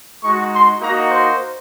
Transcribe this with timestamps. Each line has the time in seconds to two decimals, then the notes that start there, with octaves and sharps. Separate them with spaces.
0.24 G#3 D#4 F#4 C#6
0.52 C6
0.81 A#3 D#4 F#4 A#5
1.09 C5